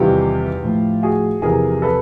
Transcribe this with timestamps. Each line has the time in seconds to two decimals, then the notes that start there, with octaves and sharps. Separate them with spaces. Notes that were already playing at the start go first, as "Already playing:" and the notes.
Already playing: E2 C3 D#3 G3 F4 G4
0.62 A2 F3
1.03 F#4 G#4
1.42 E2 C3 F3 G#4 A#4
1.82 A4 B4